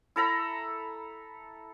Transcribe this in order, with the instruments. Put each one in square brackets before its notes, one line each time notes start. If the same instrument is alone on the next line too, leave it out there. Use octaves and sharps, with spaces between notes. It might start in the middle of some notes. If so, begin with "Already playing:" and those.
[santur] E4 A4 A#5 B5